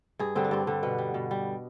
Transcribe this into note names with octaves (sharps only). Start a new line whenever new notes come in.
G2 G#4
D3 G3 C4
D4
G2 C4
D3 G3
B2 B3
G3
B2
G3